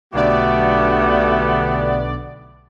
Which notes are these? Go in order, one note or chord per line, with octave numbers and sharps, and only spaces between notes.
B1 D3 A3 B3 F#4 G4 D5